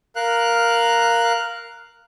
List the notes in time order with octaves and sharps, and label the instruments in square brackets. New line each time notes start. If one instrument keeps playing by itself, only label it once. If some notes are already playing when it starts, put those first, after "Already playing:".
[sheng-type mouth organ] A#4 F5 F#6